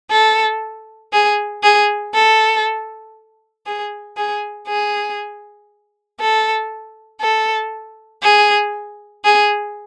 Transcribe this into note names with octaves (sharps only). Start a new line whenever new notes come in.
A4
G#4
G#4
A4
G#4
G#4
G#4
A4
A4
G#4
G#4